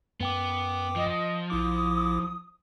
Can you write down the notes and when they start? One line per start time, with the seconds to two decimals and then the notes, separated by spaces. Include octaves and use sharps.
0.20 F#2 B3 G5 D6
0.96 F3 D#5
1.50 A#1 E4 D6 D#6